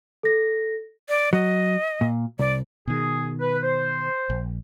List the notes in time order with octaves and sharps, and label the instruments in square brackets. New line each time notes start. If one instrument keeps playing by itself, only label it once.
[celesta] A4 A#6
[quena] D5
[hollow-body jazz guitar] F#3 [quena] D#5
[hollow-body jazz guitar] A#2
[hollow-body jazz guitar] C2 [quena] D5
[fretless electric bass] B2 D#3 [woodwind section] G#4
[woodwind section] B4
C5
[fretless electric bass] A#1